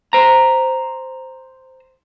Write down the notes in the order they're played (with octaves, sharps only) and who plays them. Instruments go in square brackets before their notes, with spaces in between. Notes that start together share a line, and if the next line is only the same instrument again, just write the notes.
[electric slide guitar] C5 A#5